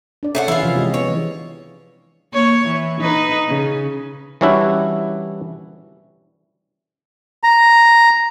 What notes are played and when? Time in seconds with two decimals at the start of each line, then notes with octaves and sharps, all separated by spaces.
0.23 D4 D5
0.35 A3 C#4 D#5 F#5
0.48 E3 C#4 E4 F4 G#4
0.63 C3 F3 C#4
0.75 G#3 G4 D#5
0.94 E3 B3 C#5
2.33 A#3 C#5
2.66 E3
3.01 D#4 B4
3.48 C#3
4.41 E3 G3 C#4 D4 E4 F#4
7.43 A#5